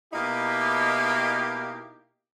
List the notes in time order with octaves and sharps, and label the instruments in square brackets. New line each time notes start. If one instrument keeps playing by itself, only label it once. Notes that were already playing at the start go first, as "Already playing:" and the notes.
[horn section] B2 A#3 D#4 E4 G4